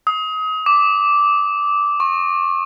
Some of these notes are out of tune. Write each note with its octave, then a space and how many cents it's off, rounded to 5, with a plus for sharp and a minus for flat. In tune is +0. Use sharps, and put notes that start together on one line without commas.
D#6 +30
D6 -10
C#6 -40